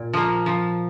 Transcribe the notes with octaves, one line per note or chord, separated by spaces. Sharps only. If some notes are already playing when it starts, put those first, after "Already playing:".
Already playing: A#2
F3 A#3
F3